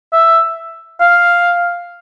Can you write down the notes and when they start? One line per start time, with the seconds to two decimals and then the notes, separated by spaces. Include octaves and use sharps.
0.13 E5
1.00 F5